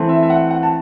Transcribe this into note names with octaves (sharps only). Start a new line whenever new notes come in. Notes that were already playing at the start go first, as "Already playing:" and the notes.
Already playing: E3 A3 C4
E5
E5
F#5
F#5
A5